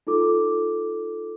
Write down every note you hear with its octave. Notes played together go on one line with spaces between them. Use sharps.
D#4 F4 A4 D6